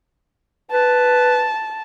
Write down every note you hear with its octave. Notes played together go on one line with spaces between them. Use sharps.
B4 A5